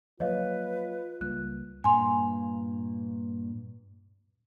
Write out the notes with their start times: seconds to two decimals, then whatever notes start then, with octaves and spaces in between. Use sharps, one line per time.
0.20 F3 F#3 A#3 F4 B4 C#5 D#5 F5
1.21 C#2 G3 A#3 F#6
1.84 G2 A#2 G#5 A#5 C6